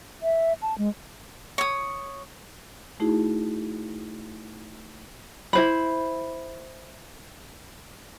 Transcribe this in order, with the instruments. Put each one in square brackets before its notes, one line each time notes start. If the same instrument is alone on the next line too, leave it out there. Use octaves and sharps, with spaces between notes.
[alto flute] E5
A5
G#3
[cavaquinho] C#5 D#6
[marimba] A3 D#4 E4 F#4 G#4
[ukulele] E4 C5 B5